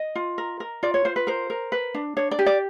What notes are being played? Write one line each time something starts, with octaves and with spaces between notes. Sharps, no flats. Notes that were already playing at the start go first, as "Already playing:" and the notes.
Already playing: D#5
F4
A#4
A#4
F4 D5
C#5
F4 C5
B4
A#4 C5
A#4
B4
D4
D4 C#5
D5
G4
D5